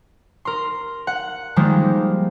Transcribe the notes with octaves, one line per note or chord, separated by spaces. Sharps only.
A#4 C6
F#5
D#3 F3 G3 G#3 A#3